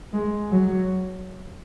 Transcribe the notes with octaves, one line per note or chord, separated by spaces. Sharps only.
G#3
F#3